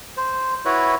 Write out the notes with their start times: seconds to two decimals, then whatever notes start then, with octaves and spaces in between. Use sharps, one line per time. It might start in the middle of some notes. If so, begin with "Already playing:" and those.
0.17 C5
0.65 E4 F#4 B4 C#5